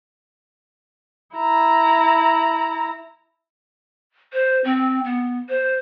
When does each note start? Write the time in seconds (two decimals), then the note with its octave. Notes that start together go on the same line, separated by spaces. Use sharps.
1.36 E4 A#5
4.33 C5
4.64 C4
5.04 B3
5.49 C5